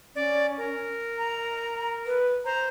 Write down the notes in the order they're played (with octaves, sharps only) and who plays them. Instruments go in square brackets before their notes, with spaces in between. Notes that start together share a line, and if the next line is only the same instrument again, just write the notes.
[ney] C#4 [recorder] D5
[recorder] A#4
[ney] A#5
B4
[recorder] C5 [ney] A#5